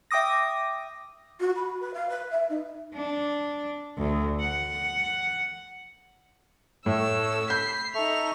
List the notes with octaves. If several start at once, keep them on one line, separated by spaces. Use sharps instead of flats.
E5 G5 D6 D#6 A#6
F#4
B5
B4
F5
B4
E5
D#4
D4
D2
F#5
A2 A3 A4 C#5 E6
B5 G6 B6 C7
D#4 A4 E5 C#6 F7